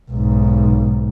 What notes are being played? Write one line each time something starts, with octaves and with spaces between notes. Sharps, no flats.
B1 G#2